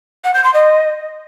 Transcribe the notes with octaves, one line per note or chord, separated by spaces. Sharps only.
F#5
G6
C6
D#5